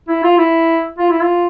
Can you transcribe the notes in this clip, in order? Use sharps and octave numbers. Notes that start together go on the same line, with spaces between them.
E4
F4
E4
F4
E4
F4